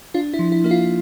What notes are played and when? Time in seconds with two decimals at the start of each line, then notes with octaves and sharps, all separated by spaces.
0.14 D4 F4
0.34 E4
0.39 F3
0.52 E4
0.64 A#3 E4
0.71 F4